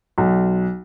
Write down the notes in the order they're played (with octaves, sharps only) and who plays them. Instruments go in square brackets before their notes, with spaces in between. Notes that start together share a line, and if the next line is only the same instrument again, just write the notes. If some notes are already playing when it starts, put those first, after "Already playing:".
[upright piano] B1